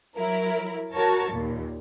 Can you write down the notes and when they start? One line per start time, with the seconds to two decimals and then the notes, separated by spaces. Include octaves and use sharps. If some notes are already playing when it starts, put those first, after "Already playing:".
0.16 F#3 E4 A#4
0.93 F#4 A#4 C#5 A5
1.32 D#2 A#2